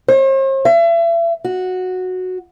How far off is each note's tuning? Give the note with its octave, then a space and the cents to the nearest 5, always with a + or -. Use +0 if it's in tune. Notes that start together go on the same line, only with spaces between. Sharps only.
C5 +45
E5 +35
F#4 -10